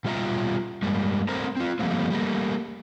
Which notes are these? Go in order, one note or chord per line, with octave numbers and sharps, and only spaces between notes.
B2 G3 F4 E5 G5 A#5
G2 G3 G#3 A#3
A3 C4 A#4 C5 A#5
C4 F4
F3 G3 A3 A#3 C4
G3 A3 A#3